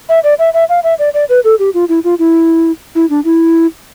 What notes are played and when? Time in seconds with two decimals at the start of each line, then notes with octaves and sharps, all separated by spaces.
0.09 E5
0.24 D5
0.39 E5
0.54 E5
0.69 F5
0.84 E5
0.99 D5
1.14 D5
1.29 B4
1.44 A4
1.59 G4
1.74 F4
1.89 E4
2.04 F4
2.19 E4
2.95 E4
3.10 D4
3.24 E4